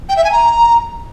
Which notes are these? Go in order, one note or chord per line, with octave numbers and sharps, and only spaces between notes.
G5
E5
G#5
A#5